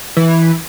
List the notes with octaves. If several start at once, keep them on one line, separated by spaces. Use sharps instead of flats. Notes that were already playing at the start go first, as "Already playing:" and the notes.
E3